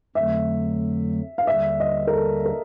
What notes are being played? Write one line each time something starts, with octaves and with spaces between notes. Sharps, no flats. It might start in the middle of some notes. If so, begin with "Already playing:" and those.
F2 D3 F#3 A3 E5
F5
D#2 D3 G3 E5
D#5
A#4
A4
A#4